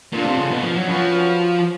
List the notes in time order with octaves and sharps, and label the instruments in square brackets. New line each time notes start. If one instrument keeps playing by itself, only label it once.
[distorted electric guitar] A#2 [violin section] D4 F4 A4
[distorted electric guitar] C3
C#3
B2
F3
F#3
[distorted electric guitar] F3 [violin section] C#4 F#4 B4